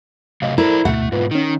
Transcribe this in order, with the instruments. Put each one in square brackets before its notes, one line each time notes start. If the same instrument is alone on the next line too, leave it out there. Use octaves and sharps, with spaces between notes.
[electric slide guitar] C3 F#3 A3 [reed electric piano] D#5 F5
[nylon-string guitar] E4 [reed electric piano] A4 A#4 [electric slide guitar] C5 D5 A#5
[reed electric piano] D2 G#2 B2 [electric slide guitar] A3 [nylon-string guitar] F#5
[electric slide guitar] G#2 B2 [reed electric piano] F4 B4
[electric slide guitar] D#3 [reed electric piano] C#4 D#4